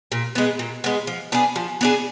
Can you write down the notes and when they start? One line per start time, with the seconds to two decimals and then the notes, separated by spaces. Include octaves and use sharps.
0.12 A#2
0.35 G#3 B3
0.59 A#2
0.84 G#3 B3
1.07 F3
1.32 B3 D4 G#4
1.56 F3
1.81 B3 D4 G#4